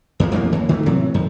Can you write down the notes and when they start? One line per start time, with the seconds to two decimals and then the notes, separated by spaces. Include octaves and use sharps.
0.20 E2 E3 F3
0.32 A1 F2 B2 A#3
0.52 D#2 E3
0.69 D#3 E3 G3 A3
0.86 A2 C3 E3 F#3
1.14 F2 D#3